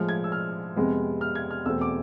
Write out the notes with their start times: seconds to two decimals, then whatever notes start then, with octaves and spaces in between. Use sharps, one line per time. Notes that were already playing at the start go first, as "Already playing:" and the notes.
Already playing: A2 F3 G#3 F6
0.09 G#6
0.24 E6
0.32 F6
0.76 F2 C3 G#3 B3
1.21 F6
1.35 G#6
1.51 F6
1.66 E2 B2 A3 C4 E6
1.81 D6